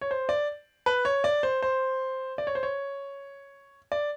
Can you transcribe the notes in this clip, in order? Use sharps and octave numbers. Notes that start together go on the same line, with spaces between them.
C#5
C5
D5
B4
C#5
D5
C5
C5
D5
C#5
C5
C#5
D5